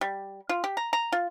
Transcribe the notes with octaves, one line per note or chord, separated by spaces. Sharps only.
G3
F4
G4
A#5
A#5
F4